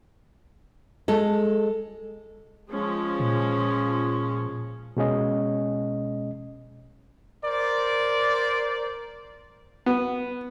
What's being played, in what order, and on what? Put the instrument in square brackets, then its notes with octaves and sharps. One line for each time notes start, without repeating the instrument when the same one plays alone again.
[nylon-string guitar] G#3 A4
[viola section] F3 G#3 C#4
[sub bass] A#2
[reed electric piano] B2 G#3 C#4 D#5
[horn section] A#4 C5 D5
[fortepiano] B3